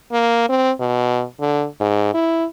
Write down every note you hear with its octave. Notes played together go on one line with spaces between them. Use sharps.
A#3
C4
B2
D3
G#2
E4